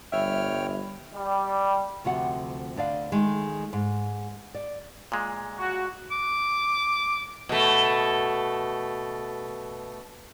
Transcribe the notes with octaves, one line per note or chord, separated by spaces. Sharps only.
G1 G3 C#5 E5 G5 B5 F6
G3
D2 C3 F3 F#4 F#5
D2 D3 D5 F5
D#3 G#3 A3
G#2
D5
A#2 G#3
F#4
D6
B2 A3